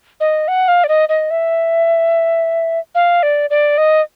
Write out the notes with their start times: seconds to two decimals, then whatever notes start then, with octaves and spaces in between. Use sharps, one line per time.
0.20 D#5
0.48 F#5
0.68 F5
0.84 D5
0.88 D#5
1.09 D#5
1.30 E5
2.95 F5
3.23 D5
3.50 D5
3.78 D#5